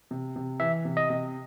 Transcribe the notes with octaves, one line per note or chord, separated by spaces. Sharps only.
C3
C3
E3 E5
C3
D#5
C3